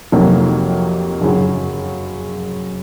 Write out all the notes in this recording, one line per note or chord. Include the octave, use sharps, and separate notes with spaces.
F2 C3 F#3 A#3 D#4
F#2 C#3 F#3